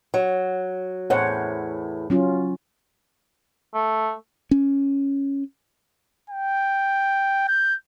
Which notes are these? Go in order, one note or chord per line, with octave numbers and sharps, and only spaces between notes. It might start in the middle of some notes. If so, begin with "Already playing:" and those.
F#3
E2 A2 C5 C#5 F#5
F#3 C#4 F4
A3
C#4
G5
G6